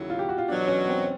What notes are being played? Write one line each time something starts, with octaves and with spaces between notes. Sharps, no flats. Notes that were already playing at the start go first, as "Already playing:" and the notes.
Already playing: D#2 C#3 F#3 E4
F4
G4
F#4
F4
E2 B2 F#3 D4
C#4
C4